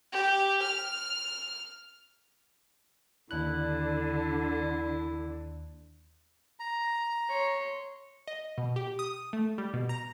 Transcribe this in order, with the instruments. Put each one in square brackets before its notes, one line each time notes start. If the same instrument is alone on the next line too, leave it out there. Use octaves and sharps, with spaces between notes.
[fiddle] G4
F6
[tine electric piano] D#2 D4 F#6 [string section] D3 [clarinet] E4
[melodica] A#5
[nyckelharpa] C#5 C6
[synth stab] D#5
B2
G4
D#6
A3
G3
B2
A#5